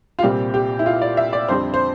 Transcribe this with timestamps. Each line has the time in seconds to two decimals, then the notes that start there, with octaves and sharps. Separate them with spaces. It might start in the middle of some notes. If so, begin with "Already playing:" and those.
0.19 F4
0.23 C2 A#2 G3 C4 G4
0.54 G4
0.79 E4
0.86 F4
1.02 D5
1.17 E5
1.33 D5
1.49 F2 D3 G3 C4 C5
1.74 C5